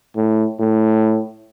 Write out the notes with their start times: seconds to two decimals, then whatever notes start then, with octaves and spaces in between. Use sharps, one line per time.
0.16 A2
0.59 A2